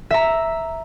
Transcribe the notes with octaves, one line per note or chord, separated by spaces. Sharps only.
E5 A#5